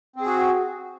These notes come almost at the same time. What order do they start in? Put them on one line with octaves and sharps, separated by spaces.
C4 G#4 F#4